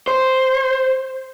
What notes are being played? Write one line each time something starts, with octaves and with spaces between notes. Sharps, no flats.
C5